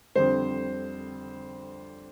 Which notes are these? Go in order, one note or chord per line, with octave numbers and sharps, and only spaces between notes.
F2 D3 G3 C5